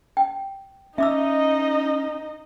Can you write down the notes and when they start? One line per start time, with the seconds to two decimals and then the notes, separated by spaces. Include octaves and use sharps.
0.17 G5
0.98 C#4 D#4 D#5 E5 D6 E6